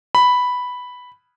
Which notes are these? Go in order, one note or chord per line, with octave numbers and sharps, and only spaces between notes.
B5